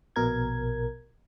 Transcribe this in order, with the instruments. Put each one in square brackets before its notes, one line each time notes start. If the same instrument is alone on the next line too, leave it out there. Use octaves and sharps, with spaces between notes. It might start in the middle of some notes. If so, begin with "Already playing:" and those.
[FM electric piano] A#1 B2 A#4 G#6